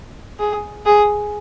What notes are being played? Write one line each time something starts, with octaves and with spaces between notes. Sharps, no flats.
G#4
G#4